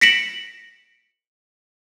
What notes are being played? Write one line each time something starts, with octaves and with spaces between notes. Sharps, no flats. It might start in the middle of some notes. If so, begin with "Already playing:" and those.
A#6 B6 C#7 D7 E7 F#7